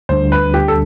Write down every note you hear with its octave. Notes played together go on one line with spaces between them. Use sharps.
D2 D3 G3 D4 C5
B4
G4
A4